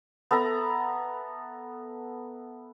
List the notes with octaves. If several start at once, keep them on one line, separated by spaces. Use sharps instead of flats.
B3 A4 E5 A#5